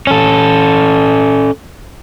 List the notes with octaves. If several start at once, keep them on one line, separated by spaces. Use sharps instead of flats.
C#4 A4